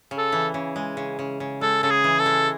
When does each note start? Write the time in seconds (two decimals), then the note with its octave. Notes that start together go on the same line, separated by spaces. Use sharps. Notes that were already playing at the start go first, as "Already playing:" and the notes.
0.11 C#3
0.18 A4
0.32 E3
0.54 C#3
0.76 G#3
0.97 C#3
1.19 C#3
1.40 C#3
1.61 G#3 A4
1.83 C#3 A4
1.90 G#4
2.04 E3
2.19 A4
2.26 G#3